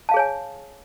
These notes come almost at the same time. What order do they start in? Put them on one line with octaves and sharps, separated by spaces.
A5 F5 G#4 C#5 G#5